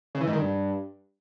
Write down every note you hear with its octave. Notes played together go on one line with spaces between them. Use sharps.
C#3
E3
G#2
D#3
G2